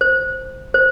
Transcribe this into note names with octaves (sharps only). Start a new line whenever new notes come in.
C5
C5